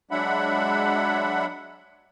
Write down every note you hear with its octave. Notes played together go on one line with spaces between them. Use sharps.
F#3 G#3 D4 E5 F#5 B5